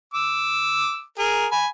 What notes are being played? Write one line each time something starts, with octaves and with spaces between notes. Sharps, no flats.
D6 E6
G#4 A#4
G#5 B5